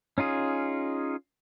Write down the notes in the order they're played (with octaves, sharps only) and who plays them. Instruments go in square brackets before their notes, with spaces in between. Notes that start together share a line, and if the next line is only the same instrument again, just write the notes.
[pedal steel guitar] C#4 D#4 F4 G#4